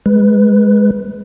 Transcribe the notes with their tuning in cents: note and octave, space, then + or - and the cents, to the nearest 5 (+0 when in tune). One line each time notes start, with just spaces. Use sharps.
G#3 +0 B4 +0